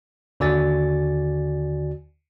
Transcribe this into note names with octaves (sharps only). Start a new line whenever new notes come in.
D#2 D3 F#4 D5 G#5 A6